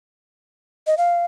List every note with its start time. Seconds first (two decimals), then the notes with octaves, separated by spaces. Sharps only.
0.87 D#5
0.98 F5